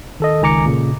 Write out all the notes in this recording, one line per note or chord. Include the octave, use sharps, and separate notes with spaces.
D#3 A4 D#5
C#2 D#3 G#5 A#5 D6 C#7
A#2 C#3